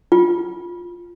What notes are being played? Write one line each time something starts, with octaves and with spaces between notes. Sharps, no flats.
F4